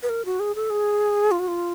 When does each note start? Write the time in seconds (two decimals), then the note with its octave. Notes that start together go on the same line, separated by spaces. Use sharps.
0.03 B4
0.09 A#4
0.25 F#4
0.40 G#4
0.55 A4
0.70 G#4
1.31 F4
1.39 F#4
1.48 F4